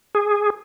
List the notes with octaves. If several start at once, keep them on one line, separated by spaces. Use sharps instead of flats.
G#4